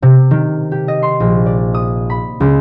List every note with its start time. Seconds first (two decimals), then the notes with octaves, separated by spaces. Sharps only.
0.02 C3
0.31 D#3
0.72 G4
0.88 D#5
1.02 C6
1.20 A#1
1.46 D5
1.74 D#6
2.10 B5
2.40 C#2